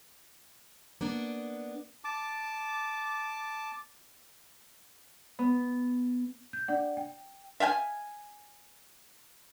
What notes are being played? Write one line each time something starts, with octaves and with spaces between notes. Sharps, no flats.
A#3 B3 D4
A5 D6
B3
G6
D4 D5 F#5
G5
E5 F5 G5 G#5